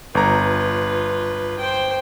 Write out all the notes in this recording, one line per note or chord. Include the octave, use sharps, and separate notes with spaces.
G1 F4 B4 A#5
C5 G5